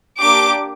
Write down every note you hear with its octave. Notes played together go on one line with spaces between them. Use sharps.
A#3 D4 G4 D6